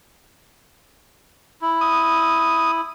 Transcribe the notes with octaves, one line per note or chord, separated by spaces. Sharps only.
E4
D#6